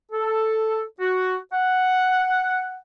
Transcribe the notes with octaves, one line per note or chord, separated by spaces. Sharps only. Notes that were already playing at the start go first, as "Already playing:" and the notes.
A4
F#4
F#5